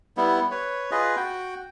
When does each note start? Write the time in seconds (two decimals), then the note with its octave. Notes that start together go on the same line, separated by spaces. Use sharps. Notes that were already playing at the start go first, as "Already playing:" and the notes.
0.17 G3 B3 E4
0.51 B4 C#5
0.91 F4 G#4 B4 D#5
1.17 F#4 G5